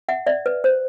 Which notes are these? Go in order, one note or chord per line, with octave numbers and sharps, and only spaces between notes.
E5 F#5
D5 E5
B4
C5